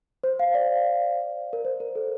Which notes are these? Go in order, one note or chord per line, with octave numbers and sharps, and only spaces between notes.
C5
F5
D5
A#4
C5
A#4
A4